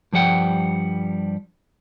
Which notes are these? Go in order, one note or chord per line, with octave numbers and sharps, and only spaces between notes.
G2 F3 G3 F#5 G5